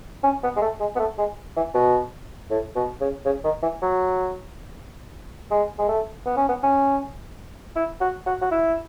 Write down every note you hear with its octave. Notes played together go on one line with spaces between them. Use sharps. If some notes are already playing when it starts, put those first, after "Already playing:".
C#4
B3
G#3
A3
G#3
B3
A3
G#3
E3
B2
A2
B2
C#3
C#3
D#3
E3
F#3
G#3
G#3
A3
B3
C#4
B3
C#4
E4
F#4
F#4
F#4
E4